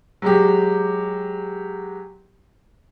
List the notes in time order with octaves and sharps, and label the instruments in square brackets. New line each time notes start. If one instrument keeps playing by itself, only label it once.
[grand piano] F#3 G#3 G4